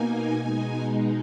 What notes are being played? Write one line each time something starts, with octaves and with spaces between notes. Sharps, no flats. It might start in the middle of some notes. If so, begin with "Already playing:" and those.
Already playing: B2 A#3 D#4 G#5
B2 G#3 D#4